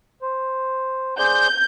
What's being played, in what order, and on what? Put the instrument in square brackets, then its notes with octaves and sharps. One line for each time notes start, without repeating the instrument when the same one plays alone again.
[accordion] C5
[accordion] G#4 C5 D5 [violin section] G6